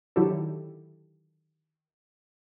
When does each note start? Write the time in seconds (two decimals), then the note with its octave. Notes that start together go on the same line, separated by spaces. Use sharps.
0.16 D3 D#3 F#3 E4 G4 A4